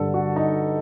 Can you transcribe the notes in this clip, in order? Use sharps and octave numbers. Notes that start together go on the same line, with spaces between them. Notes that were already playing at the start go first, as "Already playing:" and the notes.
Already playing: G2 D3 A4
F#4
D#4